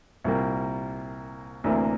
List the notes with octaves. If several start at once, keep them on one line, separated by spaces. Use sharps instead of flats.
C2 A#2 G3 A#3
D2 C3 E3 A#3 D4